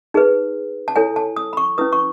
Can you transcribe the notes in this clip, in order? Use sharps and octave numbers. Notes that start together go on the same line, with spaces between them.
D#4 G#4 B4
A5
E4 A4 C#5 G#5
A5
D#6
B5
C#6
C#4 E4 B4 D#6
C#6